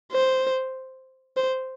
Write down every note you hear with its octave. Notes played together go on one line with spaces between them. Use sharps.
C5
C5